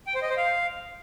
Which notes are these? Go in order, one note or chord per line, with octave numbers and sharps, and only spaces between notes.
G5
C5
D#5
C5
F5